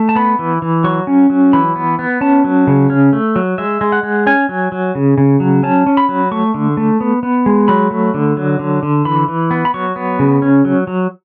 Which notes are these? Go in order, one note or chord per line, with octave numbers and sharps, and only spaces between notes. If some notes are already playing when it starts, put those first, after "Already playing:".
Already playing: A3
A5
B3 B5
E3
E3
F#3 C#6
C#4
F#3
E3 B5
B3
B3
C#4 A5
F#3
C#3
C#4
A3
F#3
G#3 E5
G#3
F#5
G#3
C#4 G#5
F#3
F#3
C#3
C#3
F#3
C#4 A5
C#4
B5
F#3
A3 C#6
D3
A3
B3
B3
G#3
F#3 B5
A3
D3
F#3
D3
D3
E3 B5
E3
B3
B5
F#3 C#6
B3
C#3
C#4
F#3
F#3